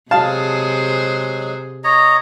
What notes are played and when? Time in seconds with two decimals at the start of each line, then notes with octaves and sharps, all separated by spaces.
0.11 C3 F#3 G#3 G#4 C5 F5 A5
1.84 C#5 D#5 A#5